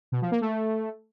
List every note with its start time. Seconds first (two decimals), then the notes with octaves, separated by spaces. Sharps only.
0.12 B2
0.22 F3
0.31 A#3
0.41 A3